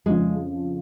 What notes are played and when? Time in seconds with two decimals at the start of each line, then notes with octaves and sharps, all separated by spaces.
0.06 F2 C#3 F3 G#3